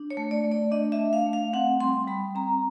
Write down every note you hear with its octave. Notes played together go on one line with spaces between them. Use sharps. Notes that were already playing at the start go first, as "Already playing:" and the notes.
Already playing: D4
C#5
A3
D5
A3
D5
D4 D#5
E5
A3
F5
A3
F5
C4 F#5
G3 C6
G3 B5
C4 A#5